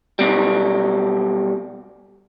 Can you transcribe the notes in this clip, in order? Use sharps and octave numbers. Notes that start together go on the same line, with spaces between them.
B1 B2 G3